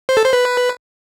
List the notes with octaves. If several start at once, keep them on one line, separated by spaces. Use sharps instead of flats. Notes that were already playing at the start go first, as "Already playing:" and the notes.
C5
A4
C5
B4